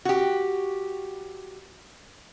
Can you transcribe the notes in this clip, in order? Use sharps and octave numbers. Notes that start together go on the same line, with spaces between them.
F#4 G4